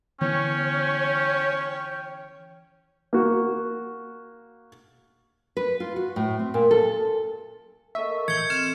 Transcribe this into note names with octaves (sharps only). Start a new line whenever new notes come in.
D3 E3 B3 C#4 C#5 G5
A#3 F#4
B4
F4
F#4
A2
C4
A#2
A4
A#3 A4 D#5 E5 C#6
A1 G6 G#6 C#7
C4 F6 E7